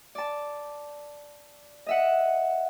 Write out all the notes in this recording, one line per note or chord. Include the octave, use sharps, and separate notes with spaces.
D5 A5
D#5 E5 F#5